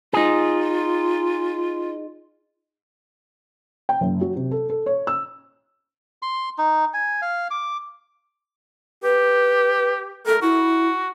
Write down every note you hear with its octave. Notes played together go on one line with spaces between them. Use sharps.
D#4 F4 G#4
G5
F#1
F#3
C3
A4
A4
C#5
E6
C6
D#4
G#5
F5
D6
G4 B4
A4 A#4
E4 F#4